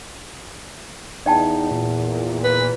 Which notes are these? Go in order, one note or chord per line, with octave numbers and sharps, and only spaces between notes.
E2 D#4 D5 G5 A5
A#2
B4